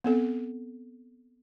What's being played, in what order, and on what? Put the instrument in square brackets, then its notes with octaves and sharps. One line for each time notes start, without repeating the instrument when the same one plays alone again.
[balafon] B3 C4 A4